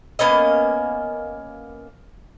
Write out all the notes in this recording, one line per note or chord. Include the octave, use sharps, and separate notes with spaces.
A#3 B3 C#4 D#5